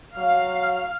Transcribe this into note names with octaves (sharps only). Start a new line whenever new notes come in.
F#3 F5